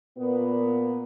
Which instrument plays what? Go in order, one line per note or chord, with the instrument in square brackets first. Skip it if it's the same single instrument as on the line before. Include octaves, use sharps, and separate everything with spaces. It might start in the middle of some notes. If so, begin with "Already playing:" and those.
[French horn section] A#2 B3